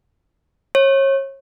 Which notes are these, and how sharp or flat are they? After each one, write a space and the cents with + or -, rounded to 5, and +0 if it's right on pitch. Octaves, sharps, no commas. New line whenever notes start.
C#5 -35